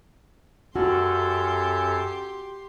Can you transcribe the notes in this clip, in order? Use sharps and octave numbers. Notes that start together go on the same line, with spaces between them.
F#2 C#4 F#4 G4 A4 C6